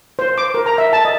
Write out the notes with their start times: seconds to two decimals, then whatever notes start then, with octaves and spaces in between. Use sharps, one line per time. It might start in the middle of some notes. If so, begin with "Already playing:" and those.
0.19 C5
0.38 D6
0.54 A#4
0.66 A#5
0.78 E5
0.93 A5
1.05 D#5